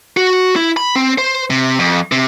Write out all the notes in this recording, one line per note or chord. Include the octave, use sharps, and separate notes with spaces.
F#4
E4
B5
C4
C5
C3
F2
C3